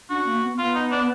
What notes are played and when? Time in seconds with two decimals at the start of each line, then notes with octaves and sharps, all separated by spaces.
0.10 D4 F#4
0.26 A#3
0.42 B3
0.58 B3 F4
0.75 D#4
0.91 D4